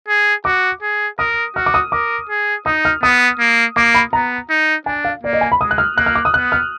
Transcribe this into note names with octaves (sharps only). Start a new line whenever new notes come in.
G#4
F#4 D6
G#4
A#4 D#6
F#4 F6
D6
D#6
A#4 D6
G#4
D#4 D#6
F6
B3 D#6
A#3
A#3 D6
B5
B3 A#5
D#4
D4 G#5
F5
A#3 D5
D#5
G#5
B5
G#3 D#6
F#6
F6
A#3 F#6
F6
D6
D#6
B3 F#6
F6